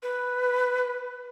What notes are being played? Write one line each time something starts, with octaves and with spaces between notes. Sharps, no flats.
B4